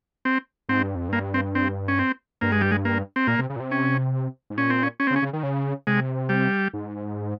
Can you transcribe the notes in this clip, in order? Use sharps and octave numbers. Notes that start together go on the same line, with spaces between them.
C4
G#2 C4
G2
F2
G2 A#3
C4
C4
C#4
C4
G2 A#3
G#3
G3
G#3
A#3
C4
A#2 A#3
C3
C#3
A#2
C3
C#4
G#2
A#2 C#4
C4
C#4
C#4
C4
C#3
C#4
C#3
D#3
C#3
C3 G#3
G3
G#2